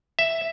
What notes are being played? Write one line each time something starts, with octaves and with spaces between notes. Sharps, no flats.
E5